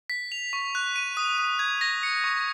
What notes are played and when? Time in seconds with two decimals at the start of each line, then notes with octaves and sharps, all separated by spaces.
0.10 B6
0.32 F7
0.53 C#6
0.75 F#6
0.96 D#7
1.17 D#6
1.38 D#6
1.59 G#6
1.81 A#6
2.03 C#7
2.24 C#6